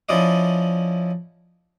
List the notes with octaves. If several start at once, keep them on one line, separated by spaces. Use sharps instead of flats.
F3 C#4 E4 D5 D#5